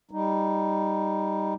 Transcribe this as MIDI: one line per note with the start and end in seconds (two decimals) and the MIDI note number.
0.11 1.54 55
0.11 1.54 63